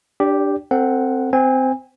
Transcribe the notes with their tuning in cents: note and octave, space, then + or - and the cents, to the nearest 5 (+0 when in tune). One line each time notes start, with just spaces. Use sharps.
D4 +0 G4 +0 D5 -45
C4 +0 A4 +35 F#5 +0
C4 -15 G#5 -30